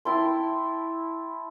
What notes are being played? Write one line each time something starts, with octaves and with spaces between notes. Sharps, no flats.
E4 G5 A5 C6